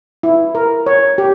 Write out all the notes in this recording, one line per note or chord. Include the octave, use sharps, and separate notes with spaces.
E4
A#4
C#5
G4